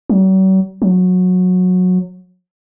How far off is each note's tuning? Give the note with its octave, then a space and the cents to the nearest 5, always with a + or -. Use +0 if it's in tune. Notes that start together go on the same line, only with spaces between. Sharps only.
F#3 +45
F#3 -20